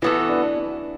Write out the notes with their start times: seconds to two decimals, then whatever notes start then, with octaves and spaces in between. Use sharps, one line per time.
0.02 E3 B3 E4 F#4 A4
0.29 D4
0.57 D4